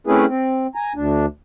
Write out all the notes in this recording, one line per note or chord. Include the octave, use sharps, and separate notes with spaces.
A3 C4 C#4 E4 G#4 B4
C4
G#5 A#5
D2 D4